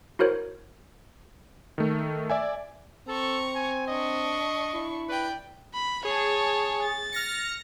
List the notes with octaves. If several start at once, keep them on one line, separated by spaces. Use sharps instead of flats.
E4 F#4 A#4 C5 C#5
D#3 A3
D5 E5 G#5
C4 A4 A#5 C#6
G#5
D4 D#5 C#6
E4
B4 D5 G5
B5
G#4 C#5 A5
A6
F6 A#6 C#7